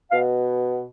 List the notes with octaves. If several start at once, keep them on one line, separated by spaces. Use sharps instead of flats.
B2 F5